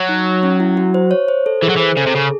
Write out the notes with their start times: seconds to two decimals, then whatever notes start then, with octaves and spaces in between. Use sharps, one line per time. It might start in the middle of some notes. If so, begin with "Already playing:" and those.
Already playing: F#3
0.09 D#4
0.43 C#4
0.60 E4
0.77 F#4
0.94 C5
1.11 C#5
1.28 C5
1.46 A4
1.62 E3 G#4
1.70 F#3
1.77 E3 C5
1.97 C#3 A4
2.07 C3
2.15 C#3 G#4